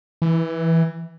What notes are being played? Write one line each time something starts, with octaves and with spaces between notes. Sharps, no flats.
E3